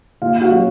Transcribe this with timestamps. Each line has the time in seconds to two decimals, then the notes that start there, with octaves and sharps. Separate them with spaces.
0.22 A#2 F4 F5
0.37 F5
0.41 F#4 F#5
0.51 F#3 C#4